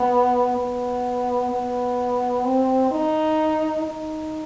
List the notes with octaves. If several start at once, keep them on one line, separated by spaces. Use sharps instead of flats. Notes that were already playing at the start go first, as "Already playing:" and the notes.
Already playing: B3
B3
B3
C4
D#4
D#4